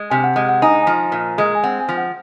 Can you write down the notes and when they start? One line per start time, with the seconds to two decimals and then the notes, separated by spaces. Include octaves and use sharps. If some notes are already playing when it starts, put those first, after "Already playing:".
Already playing: G#3
0.10 C3 G#5
0.24 F#5
0.36 G#3 F#5
0.49 F#5
0.62 D#4 G#5
0.82 F3 G#5
1.12 A#2
1.38 G#3
1.55 G#5
1.63 C4 F#5
1.80 G#5
1.89 F3
1.97 F#5